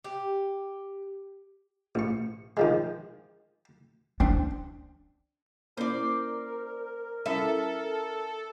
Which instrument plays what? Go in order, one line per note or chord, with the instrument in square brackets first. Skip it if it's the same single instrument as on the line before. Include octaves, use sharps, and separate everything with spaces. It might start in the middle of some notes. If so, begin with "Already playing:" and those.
[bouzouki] G4
[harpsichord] A1 C#6
D#3 F3 G#3
[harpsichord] C4 [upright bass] D4
[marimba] A#3 C#4 E4 [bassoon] A#4 [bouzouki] C5 D5
[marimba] G3 C#4 E4 [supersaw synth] A4 [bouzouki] E5